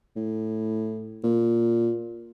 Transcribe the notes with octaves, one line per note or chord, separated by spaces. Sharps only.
A2
A#2